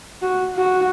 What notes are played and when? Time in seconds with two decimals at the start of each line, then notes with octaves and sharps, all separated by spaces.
0.22 F#4
0.56 F#4